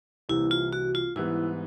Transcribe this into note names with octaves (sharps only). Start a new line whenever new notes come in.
C2 C3 E3 G3 A#3 E4
F4
F#4
F4
G#2 E3 G3 B3 E4